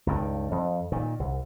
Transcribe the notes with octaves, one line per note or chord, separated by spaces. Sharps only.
C#2 G2 D#3
F2
A#2 D#3
C2